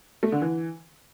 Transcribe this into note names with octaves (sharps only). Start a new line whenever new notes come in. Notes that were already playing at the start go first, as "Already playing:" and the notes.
A3
D3
E3